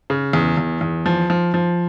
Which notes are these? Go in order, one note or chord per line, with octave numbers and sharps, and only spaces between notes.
C#3
E2
E2
E2
F3
F3
F3